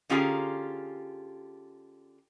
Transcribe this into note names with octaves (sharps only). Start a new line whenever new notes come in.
D3 C#4 F4 G4 G#4 A#5